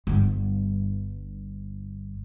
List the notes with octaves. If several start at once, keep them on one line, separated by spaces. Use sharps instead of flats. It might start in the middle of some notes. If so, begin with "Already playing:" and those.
G1 G2